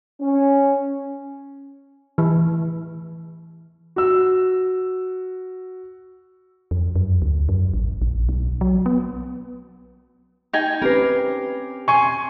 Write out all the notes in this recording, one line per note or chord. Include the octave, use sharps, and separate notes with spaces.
C#4
E3
F#4 E6
F2
F#2
D2
F#2
A1
A#1
B1
F#3
B3
D#4 G5 G#5 G6
C4 C#4 G4 A#4 B4 C7
G#5 C6 C#6